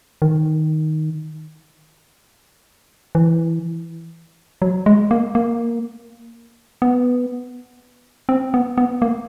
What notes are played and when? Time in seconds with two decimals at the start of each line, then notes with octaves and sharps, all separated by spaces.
0.22 D#3
3.15 E3
4.62 F#3
4.86 G#3
5.11 A#3
5.35 A#3
6.82 B3
8.29 C4
8.54 B3
8.78 B3
9.02 A#3